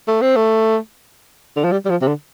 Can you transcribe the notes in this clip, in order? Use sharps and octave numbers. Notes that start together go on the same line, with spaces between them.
A3
C4
A3
D3
F3
G3
G3
F3
C3
D3